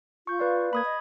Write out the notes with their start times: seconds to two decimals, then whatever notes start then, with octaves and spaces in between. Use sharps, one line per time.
0.27 F4 C#6 G6
0.39 B4 D5 F5
0.73 A#3 B5 D#6 G#6
0.85 D#5